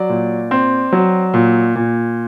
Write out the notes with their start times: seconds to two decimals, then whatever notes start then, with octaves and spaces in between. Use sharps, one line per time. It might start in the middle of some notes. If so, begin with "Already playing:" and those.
Already playing: F#3 D5
0.09 A#2
0.51 C4
0.93 F#3
1.34 A#2
1.75 A#2